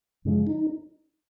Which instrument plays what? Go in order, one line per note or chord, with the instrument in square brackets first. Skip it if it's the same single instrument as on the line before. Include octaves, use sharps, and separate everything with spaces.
[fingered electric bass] F#2 C#3 F3 G#3
[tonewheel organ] D#4